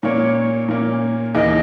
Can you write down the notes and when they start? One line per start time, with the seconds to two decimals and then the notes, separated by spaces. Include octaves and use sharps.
0.03 A#2 A#3 C#4 C#5
0.69 A#2 A#3 C#4
1.34 D#2 C#3 E3 A#3 D#4 D#5